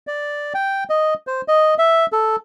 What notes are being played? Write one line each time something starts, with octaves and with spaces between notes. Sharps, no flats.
D5
G5
D#5
C5
D#5
E5
A4